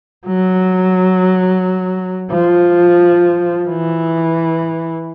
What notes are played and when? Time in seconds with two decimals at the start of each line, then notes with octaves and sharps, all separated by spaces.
0.27 F#3
2.31 F3
3.69 E3